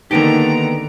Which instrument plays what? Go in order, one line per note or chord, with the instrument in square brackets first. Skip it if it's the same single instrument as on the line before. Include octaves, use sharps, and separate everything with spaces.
[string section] D3 D#3 A#5 [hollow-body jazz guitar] A#3 B3 G4 [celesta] D#4 D7